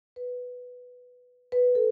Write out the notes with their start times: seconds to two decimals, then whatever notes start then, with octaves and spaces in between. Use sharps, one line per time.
0.16 B4
1.52 B4
1.75 A4